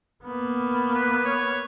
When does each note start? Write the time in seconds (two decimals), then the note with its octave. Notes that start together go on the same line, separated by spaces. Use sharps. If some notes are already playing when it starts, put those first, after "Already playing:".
0.24 A#3 B3
0.95 B4
1.25 C#5